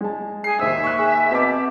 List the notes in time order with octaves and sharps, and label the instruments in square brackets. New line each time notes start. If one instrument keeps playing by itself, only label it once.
[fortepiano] G#3 A5
[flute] G#4 [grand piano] C7
[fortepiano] D#2 C5 E6 [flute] E5
[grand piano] C#6 F#6
[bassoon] G#4
[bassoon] B2 [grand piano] C4 A5 D6